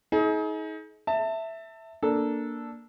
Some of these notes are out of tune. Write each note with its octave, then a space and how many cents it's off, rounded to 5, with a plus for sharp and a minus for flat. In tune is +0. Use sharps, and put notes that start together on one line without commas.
D#4 +35 G#4 +40
E5 +0 A5 +30
A#3 +0 D4 -5 A4 +0